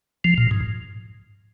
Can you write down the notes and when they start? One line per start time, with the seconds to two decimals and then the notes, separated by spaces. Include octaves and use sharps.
0.24 F3
0.38 A#2
0.51 G#2